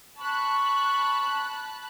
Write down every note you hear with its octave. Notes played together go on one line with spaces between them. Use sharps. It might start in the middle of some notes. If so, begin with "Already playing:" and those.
A5 B5 C#6 F#6